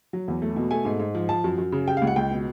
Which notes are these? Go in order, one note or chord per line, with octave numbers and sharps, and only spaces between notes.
F#3
E2
A3
B2
A3 G#5
G#2
G#2
F3
F3 A5
F#2
F#2
C#3
G3 G5
F5
C#2
F#5
C#2 G5
B2